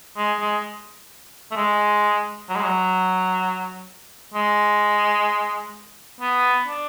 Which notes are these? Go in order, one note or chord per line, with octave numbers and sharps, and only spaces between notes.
G#3
G#3
A3
G#3
F#3
G#3
F#3
G#3
B3
D4